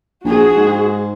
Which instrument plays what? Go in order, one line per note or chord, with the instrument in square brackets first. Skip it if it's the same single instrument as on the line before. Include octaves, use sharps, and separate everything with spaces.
[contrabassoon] A#1 [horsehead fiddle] F#4 G#4
[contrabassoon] G#2